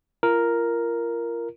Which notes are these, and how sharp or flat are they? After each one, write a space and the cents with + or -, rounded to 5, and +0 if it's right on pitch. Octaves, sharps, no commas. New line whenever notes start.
F4 -35 A#4 +0